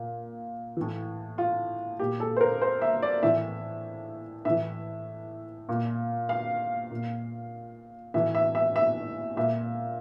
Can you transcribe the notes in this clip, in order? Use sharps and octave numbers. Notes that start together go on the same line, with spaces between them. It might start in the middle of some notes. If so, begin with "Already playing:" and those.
Already playing: A#2
A2 E3
F4
A#2 G4
A4
C5
A#4
C5
E5
D5
A2 E3 E5
A2 E3 E5
A#2
F5
A#2
A2 E3 E5
E5
E5
E5
A#2 E5